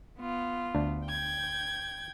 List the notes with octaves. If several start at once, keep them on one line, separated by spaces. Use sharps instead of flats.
B3 F4
D2 D4
G5 G6 G#6